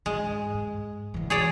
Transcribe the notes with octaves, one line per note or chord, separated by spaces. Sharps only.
G#2 G#3
G#2
D3 E3
G#4 C#5 D5